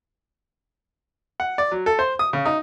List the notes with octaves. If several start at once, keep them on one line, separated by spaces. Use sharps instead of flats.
F#5
D5
F#3
A4
C5
D#6
C#3
D#4